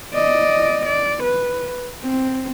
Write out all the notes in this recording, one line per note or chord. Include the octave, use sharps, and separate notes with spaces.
D5 D#5
D5
B4
C4